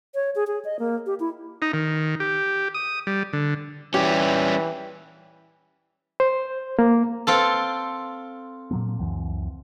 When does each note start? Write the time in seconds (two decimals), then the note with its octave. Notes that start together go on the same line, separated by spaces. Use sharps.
0.15 C#5
0.35 G#4
0.47 G#4
0.65 D#5
0.79 A#3
1.06 G4
1.20 E4
1.62 D#4
1.73 D#3
2.20 G4
2.74 D#6
3.07 G3
3.33 D3
3.94 E3 G3 C#4 G4
6.20 C5
6.79 A#3
7.27 C4 F4 A4
8.71 A#2 F#3 A#3
8.99 C#2 F#2 E3